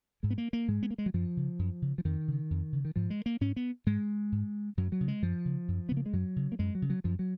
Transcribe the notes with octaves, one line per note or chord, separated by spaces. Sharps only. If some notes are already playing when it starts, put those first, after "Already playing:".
G#2 G#3
B3
A#3
A#3
G#2 G#3
B3
A#3
G#3
F#3
F#2 F3
C#3
F#2
C#3
F3
F2 D#3
C#3
F2
C#3
D#3
G#2 F3
G#3
A#3
G#2 C#4
B3
G#2 G#3
G#2
F#2 F#3
F#3
C#3
G#3
F#2 F3
C#3
F#2
C#3 B3
A#3
G#3
F#2 F#3
C#3
A#3
F#2 G#3
F#3
C#3
F#3
F#2 F3
F#3